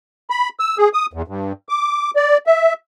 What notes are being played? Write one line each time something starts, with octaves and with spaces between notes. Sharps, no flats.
B5
E6
G#4
D#6
E2
G2
D6
D5
E5